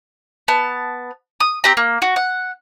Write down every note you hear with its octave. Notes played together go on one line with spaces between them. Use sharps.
B3 A5
D#6
C4 G4 A#5
A#3
F#4
F#5